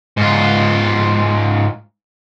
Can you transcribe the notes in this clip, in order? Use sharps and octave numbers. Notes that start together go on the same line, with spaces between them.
G#2 F4